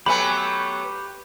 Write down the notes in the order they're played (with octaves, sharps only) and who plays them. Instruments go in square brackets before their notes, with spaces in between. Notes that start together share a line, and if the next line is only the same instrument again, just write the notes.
[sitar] F#3 A3 B3 [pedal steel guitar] G4 B4 [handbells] G#5 B5